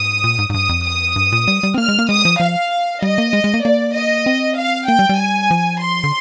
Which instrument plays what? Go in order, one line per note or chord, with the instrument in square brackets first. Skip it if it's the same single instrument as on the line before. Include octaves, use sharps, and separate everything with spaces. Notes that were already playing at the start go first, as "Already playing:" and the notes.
Already playing: [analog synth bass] G#2 [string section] D#6
[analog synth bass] A#2
G#2
G#2
[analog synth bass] G2 [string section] D#6
[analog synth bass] F2
[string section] D#6
[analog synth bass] G2
A#2
G3
G3
C4
[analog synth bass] A#3 [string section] F6
[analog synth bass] G#3
A#3
[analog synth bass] G#3 [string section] D#6
[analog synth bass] F3
[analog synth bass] F3 [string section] F5
[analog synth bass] G3 [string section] D#5
[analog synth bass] A#3
G#3
G#3
A#3
[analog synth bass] A#3 [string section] D5
[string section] D#5
[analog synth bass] C4
[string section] F5
[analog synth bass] A#3 [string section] G5
[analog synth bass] G3
G3
[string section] G#5
[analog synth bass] F3
[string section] C6
[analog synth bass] D3